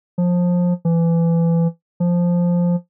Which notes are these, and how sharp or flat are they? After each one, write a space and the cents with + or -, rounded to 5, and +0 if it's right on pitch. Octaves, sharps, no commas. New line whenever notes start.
F3 +20
E3 +25
F3 +0